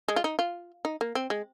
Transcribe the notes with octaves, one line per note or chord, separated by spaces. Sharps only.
G#3
F4
D#4
F4
D#4
A#3
C4
G#3